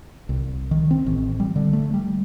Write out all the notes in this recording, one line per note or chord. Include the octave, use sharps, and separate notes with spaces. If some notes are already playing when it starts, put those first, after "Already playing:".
C2
D#3
C4
A1
G3
D3
A3
G3